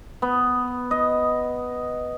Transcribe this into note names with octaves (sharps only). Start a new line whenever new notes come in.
B3
D#5